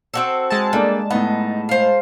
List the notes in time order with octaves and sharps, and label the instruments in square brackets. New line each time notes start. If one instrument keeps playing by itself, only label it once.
[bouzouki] C4 F#4 A4
[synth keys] G#3 A5
[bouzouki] G3 [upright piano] A#3 D4 A4
[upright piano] A2 B3 [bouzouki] D#4
[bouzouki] C5 F5